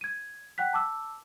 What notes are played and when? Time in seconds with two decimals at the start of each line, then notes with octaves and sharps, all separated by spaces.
0.01 G#6 D#7
0.58 F#5 G5 F#6 B6
0.73 A5 D6 E6